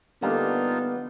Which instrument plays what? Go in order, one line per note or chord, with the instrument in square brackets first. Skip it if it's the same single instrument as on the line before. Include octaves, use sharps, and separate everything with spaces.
[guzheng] D3 [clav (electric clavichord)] G3 A#3 [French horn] B3 [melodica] D4 D#4 F4